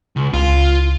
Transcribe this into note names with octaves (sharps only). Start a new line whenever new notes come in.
C#2
C#2 F4